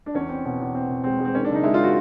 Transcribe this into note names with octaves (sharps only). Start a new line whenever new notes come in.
D4
E2 C#4
C4
B2
E2
C4
B2
G#3 C4
G#3
C4
D#3 C#4
D4
F#1
D#4
G#3 E4
F4
D#3 F#4